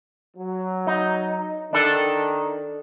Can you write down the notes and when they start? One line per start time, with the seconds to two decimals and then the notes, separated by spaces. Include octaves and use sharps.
0.37 F#3
0.87 D#4
1.73 D#3 D4 A4